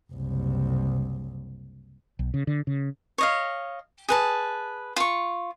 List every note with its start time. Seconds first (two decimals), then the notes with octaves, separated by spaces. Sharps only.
0.12 F#1 C2
2.19 B1
2.34 C#3
2.47 D3
2.67 C#3
3.18 C#5 D#5 F5
4.09 G#4 B4 A5
4.96 F4 C#6